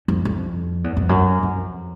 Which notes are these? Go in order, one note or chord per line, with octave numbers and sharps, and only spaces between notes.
F2
F2
E2
F2
F#2
F2